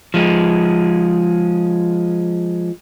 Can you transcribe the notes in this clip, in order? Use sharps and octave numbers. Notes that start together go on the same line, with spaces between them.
F3 G#3